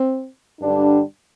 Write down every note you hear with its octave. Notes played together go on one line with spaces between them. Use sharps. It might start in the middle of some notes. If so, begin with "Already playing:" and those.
Already playing: C4
G2 D3 G3 D4